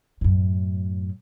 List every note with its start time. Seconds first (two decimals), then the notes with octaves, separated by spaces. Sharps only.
0.21 F#2 A2